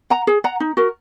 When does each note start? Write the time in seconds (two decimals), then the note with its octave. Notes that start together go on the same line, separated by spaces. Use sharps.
0.10 F#5 A#5
0.27 G#4
0.44 F#5 A#5
0.60 D#4
0.77 F#4 A#4